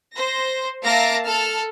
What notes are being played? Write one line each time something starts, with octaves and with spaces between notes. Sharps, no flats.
C5 A#6
A#3 E5 F5 A5 A#6 D7
A4 A5 F6